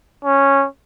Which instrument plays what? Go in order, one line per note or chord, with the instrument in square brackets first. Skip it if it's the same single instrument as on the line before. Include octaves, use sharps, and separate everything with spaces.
[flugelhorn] C#4